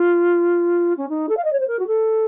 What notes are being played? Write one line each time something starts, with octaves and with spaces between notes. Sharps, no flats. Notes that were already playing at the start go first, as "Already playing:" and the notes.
Already playing: F4
C#4
D#4
A4
F5
D#5
C#5
C5
A#4
F#4
A4